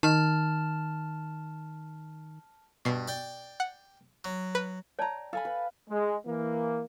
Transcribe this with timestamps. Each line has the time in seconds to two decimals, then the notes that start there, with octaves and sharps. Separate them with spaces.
0.03 D#3 A5 F6
2.85 G2 B2 C7
3.08 D5 G5
3.60 F#5
4.24 F#3
4.55 B4
4.99 C#5 D5 G5 A5 A#5
5.33 A4 F5 G#5 B5
5.45 B4
5.89 G#3
6.26 E3 A#3